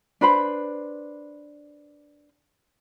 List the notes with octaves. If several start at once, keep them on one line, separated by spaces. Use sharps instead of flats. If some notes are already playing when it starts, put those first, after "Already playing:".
D4 B4 C5 B5